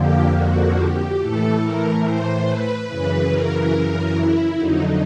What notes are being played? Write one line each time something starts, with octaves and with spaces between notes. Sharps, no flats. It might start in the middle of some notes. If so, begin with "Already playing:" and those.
Already playing: F2 D3 F3 A#3 G4
F#4
G4
A2 E3 A3 A4
A#4
C5
B4
F#2 C#3 E3 B4
A#4
E4
F2 D3 F#3 D#4